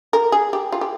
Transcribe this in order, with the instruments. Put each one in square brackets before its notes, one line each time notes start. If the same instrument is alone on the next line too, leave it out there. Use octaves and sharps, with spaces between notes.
[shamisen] A#4
G#4
G4
F4
G4